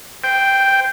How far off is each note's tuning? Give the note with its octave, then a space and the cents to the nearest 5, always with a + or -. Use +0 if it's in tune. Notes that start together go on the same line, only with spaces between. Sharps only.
C5 -20 G5 +0